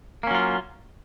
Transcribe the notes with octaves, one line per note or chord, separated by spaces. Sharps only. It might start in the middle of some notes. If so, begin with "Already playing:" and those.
F#3 A#3 C#4 F4